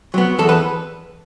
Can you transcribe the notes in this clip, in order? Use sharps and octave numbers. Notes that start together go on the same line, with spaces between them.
F#3 B3
E2 A4
B4